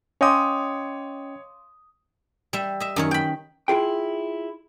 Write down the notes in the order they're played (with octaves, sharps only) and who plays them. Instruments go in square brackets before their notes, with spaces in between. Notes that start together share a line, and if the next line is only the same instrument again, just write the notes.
[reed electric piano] C#4 D#5 G5 [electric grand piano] C#5 D#6 [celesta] F5 C6 D6
[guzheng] G3 E5
D#5 E5
F#2 D#3 C#5
G5 B5
[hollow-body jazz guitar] E4 F4 G#4 G5